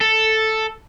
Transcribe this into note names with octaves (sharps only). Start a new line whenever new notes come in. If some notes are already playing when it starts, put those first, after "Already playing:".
A4